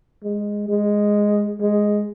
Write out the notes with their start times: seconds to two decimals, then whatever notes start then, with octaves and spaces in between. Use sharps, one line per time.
0.24 G#3
0.69 G#3
1.60 G#3